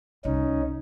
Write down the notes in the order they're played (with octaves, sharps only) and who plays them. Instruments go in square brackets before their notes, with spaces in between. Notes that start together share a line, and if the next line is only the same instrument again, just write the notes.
[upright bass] C2 [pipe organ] C#4 D#4